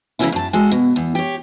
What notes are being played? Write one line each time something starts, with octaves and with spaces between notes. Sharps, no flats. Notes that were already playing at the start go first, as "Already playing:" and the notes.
C#3 E3 G3 A#3 C#4 E4
F#2 A5
G#3 F#4 A4
B2
E2
G4 C#5